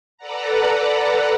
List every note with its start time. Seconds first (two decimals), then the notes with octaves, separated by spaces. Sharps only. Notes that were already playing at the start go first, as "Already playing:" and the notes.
0.17 A4 B4 D5 F#5 A#5